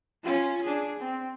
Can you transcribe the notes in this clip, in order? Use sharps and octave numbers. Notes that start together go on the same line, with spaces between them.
C#4 F4
D4 G#4
C4